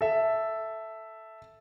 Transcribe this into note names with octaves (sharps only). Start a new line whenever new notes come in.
A4 E5